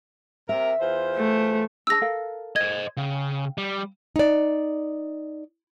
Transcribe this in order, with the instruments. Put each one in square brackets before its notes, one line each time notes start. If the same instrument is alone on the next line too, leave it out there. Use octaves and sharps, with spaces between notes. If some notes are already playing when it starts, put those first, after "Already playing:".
[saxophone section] C3 A#4 [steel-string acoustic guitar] E5
[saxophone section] E2 F4 C5
[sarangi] A3
[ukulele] D4 G#4 A5 [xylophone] E6 A#6
[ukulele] A4 A#4 F5
[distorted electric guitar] C5 D#5 [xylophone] G#6
[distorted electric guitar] C#3 [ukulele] F5 G5
[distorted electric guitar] G3
[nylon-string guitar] D#4 D5